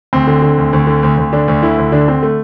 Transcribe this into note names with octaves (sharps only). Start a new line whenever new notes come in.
D2 C4
D3
D3
D2
D2
D3
D2
D2
D3 D4
D2
D3 E4
D2
D3 D4
D3 C4
A3